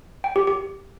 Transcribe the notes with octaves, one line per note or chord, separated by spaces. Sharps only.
G5
G4
G4